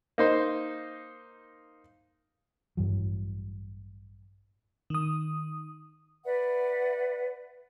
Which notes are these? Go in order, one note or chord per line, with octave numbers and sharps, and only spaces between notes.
A#3 D#4 C5
A1 G2 E3 F#3
D#3 D#6
B4 D5 E5 F#5